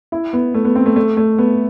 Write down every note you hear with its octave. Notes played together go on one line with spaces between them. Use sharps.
E4
B3
A3
B3
C4
A3
A3
A3
B3